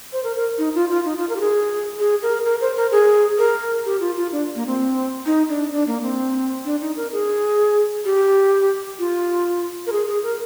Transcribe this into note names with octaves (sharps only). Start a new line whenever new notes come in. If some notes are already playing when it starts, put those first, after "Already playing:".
C5
A#4
A#4
D#4
F4
F4
D#4
F4
A#4
G4
G#4
G#4
A#4
A#4
C5
A#4
G#4
A#4
G4
F4
F4
D4
A#3
C4
D#4
D4
D4
A#3
C4
D4
D#4
A#4
G#4
G4
F4
A#4
G#4
G#4
A#4